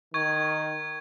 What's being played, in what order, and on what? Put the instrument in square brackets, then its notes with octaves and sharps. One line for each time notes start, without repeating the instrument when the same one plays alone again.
[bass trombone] D#3 [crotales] C#6 G#6